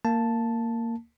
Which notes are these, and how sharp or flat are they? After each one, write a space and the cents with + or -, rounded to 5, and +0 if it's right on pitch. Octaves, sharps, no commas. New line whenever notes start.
A#3 -15 A5 +0